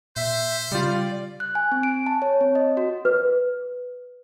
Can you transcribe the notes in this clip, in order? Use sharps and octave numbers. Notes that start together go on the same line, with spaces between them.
A#2 C5 E5
C#3 G3 F4 D5
F#6
G#5
C4
D7
A5
C#5
C4
D#5
F#4
B4